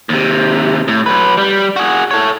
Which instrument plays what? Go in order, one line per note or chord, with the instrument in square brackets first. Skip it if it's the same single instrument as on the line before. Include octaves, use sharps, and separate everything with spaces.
[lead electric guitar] D#2 C3
A2
F#3 B4
G3
F#4 G#4
A4 C#5